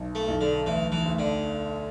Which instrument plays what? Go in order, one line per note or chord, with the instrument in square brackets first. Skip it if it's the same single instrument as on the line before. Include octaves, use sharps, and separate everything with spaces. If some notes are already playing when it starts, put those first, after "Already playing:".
Already playing: [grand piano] B1
[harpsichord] A3
[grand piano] B1
[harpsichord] D3
[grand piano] D2 [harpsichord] E3
[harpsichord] E3
[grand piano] D2
[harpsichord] D3